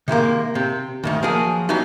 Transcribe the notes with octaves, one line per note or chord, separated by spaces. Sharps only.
C3 D#3 G#3 A#3
C3 C4
D2 G#2 D#3
F3 F#3 A#3 F#4 G#4 A#4
F#3 G3 B3 D4 D#4